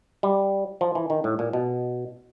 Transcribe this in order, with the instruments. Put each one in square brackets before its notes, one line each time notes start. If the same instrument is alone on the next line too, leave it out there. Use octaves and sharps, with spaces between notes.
[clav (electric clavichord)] G3
F3
E3
D#3
A2
A#2
B2